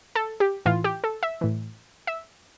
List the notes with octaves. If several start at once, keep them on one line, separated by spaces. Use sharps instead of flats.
A4
G4
A2 E3 F4
G4
A4
E5
A2 E3
E5